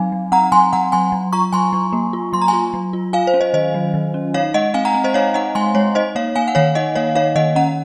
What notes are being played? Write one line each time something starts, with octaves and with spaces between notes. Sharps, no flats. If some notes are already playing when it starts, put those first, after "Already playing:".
Already playing: F#3 C4 D#4 F5 G#5
F#3
C4 F#5 A#5
F#3 G#5 C6
F#3 F#5 A#5
F#3 G#5 C6
F#3
F4 A#5 C#6
F#3 G#5 C6
F#3
A#3
F4
F#3 C6
A#5
F4 G#5 C6
F#3
F4
F4 F5 G#5
C5
C#4
C5 D#5
D#3 C5 D#5
F#3
D#3
C#4
D#4 C#5 F5
G#3 D#5 F#5
C4 F5 G#5
F#5 A#5
C4
C5 D#5
D#4 C#5 F5
D#4 D#5 F#5
G#3 G#5 C6
G#3 C#5
D#4 C5 D#5
A#3 C#5 F5
A#3 F5 G#5
F#5
D#3 C#5 F5
D#4 D#5 F#5
A#3 C#5 F5
D#4 C#5 F5
D#3 D#5 F#5
C#4 F#5 A#5